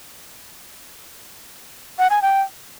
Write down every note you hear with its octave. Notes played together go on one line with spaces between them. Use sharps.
F#5
G#5
G5